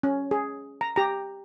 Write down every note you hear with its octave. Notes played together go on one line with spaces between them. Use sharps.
C#4
G#4
A#5
G4 A#5